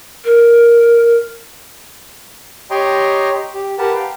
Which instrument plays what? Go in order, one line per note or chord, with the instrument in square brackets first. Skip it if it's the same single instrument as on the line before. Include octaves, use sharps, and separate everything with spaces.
[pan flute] A#4
[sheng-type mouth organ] G4 C#5 D#5 G5 A#5 C6
G4
G4 A#4 B4 F#5 A5
F5 G5